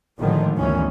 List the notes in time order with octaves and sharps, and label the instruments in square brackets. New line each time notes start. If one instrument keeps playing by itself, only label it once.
[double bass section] G#1 A2 D3 D#3 F3
G1 D2 D#3 E3 C#4